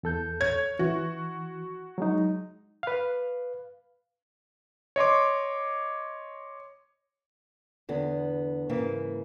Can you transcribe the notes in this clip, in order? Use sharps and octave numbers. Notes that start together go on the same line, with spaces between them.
E2 A4 G6
C#5 G#6
E3 F#4
F#3 G#3 D#4
B4 F5
C#5 D#5 C6 D6
E2 D3 B3
G#2 C#3 E3 A#3